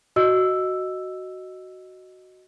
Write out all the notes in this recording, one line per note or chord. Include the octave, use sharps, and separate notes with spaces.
F#4 D#5 E6